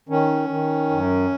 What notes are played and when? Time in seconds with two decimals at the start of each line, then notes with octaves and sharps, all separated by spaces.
0.09 D#3 C#4
0.49 D#3
0.90 F#2